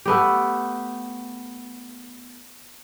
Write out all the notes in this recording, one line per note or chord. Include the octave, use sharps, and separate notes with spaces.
A3 B3 G4